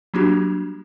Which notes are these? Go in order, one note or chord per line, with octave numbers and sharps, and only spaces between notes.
F#3 G3 A#3 D4 F#4 G4